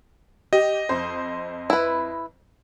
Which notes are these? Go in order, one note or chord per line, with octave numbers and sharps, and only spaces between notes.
G4 D#5
F2 C5
E4 B4